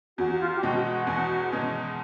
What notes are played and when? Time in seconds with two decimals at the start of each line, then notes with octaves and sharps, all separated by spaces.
0.18 E2 F#4
0.36 F#4
0.40 F4
0.56 G4
0.63 B2 G#3 C#4 F#4
0.85 F#4
1.07 E2
1.52 B2 G#3 C#4